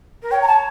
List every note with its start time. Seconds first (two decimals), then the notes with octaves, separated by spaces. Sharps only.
0.23 A#4
0.31 C#5 G5
0.42 A#5
0.48 A5